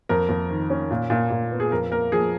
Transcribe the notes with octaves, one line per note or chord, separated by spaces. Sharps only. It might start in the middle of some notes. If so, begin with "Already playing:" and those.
F2 A#4
F2
D#3
C#4
A#2
A#2
A#2
B3
G#4
F2 A#4
A#3 A#4
F3 G#4